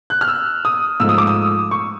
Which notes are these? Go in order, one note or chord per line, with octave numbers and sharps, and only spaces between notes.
F#6
F6
E6
D#6
G#2 F3 A3 E6
D#6
D6
D#6
C#6